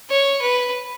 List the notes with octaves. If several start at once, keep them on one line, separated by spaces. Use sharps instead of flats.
C#5
B4